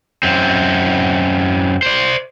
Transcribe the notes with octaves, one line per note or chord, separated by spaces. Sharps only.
F#2 C4
C5 D5